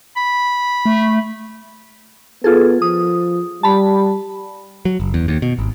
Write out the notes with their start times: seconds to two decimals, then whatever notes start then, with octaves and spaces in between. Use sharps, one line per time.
0.17 B5
0.85 A3
2.44 B3 F4 G#4 A4
2.82 F3 D#6
3.63 G3 A5 B5
4.85 F#3
5.00 F#1
5.14 E2
5.28 D#2
5.42 B2
5.59 G#1